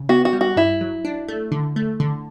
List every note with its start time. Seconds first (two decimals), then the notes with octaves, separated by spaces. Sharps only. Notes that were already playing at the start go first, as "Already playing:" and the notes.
Already playing: C#3
0.09 B3 F#4
0.25 F#4
0.33 G3
0.41 F#4
0.56 G2 E4
0.81 F#3
1.05 D4
1.28 A3
1.52 D3
1.76 A3
2.00 D3